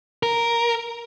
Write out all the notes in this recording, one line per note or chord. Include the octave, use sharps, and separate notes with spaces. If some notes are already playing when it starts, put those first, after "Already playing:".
A#4